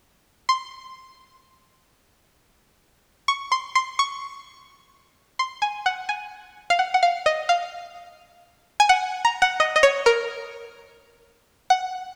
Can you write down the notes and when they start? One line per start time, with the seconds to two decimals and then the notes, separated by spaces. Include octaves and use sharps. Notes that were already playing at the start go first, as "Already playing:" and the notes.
0.49 C6
3.28 C#6
3.52 C6
3.75 C6
3.99 C#6
5.39 C6
5.62 G#5
5.86 F#5
6.09 G#5
6.70 F5
6.79 F#5
6.94 F#5
7.03 F5
7.26 D#5
7.49 F5
8.80 G#5
8.89 F#5
9.25 A#5
9.42 F#5
9.60 D#5
9.76 D#5
9.83 C#5
10.06 A#4
11.70 F#5